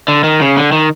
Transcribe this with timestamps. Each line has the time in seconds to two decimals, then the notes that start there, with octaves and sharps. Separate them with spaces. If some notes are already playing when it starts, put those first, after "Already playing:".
0.08 D3
0.24 D#3
0.41 C#3
0.57 D3
0.72 D#3